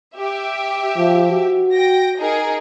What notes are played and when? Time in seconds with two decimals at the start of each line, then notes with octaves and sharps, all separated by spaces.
0.16 G4 E5
0.97 F3
1.32 F#4
1.72 G5 A#6
2.19 D#4 G#4 A#4